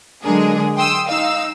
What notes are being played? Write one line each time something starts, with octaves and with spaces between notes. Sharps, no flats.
D3 F#3 G#3 D4 G#4 A#4
G5 C6 D#6 E6
D#4 F5 E6